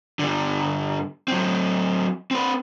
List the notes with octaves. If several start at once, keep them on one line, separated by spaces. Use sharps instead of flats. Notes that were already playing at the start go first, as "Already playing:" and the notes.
G2 D3
F#3 C4
C4 B4